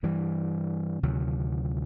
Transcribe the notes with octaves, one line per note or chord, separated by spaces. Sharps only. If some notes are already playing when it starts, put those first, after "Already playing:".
G2 E3 G3
D2 C3 D#3 F#3